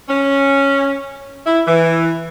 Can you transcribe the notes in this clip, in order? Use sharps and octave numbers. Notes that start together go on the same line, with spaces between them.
C#4
E4
E3